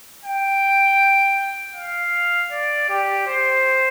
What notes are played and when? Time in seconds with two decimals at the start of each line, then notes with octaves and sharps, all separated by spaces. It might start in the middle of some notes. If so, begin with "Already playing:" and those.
0.24 G5
1.75 F5
2.51 D5
2.89 G4
3.27 C5